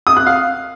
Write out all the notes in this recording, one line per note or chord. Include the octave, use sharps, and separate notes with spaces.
D#6
F#6
F5